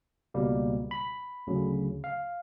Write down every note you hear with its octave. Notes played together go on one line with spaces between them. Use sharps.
C#2 B2 G3 A#3
B5
D2 C#3 F#3
F5